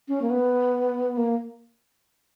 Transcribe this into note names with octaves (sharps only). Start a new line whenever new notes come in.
C#4
A#3
B3
A#3